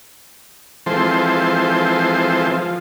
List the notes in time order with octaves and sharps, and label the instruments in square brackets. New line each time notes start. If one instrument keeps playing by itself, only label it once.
[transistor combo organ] E3 F3 G#3 C4 A4 C5
F3